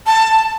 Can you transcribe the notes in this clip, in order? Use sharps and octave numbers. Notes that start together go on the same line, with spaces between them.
A5